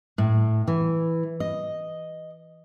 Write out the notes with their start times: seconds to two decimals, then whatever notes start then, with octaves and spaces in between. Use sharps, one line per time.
0.18 A2
0.67 E3
1.40 D#5